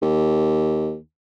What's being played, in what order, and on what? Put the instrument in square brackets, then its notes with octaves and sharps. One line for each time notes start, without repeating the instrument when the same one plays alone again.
[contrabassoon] D#2